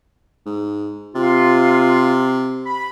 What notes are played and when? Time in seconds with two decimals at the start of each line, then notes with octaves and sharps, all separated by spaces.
0.46 G#2
1.15 C3 F4
2.67 B5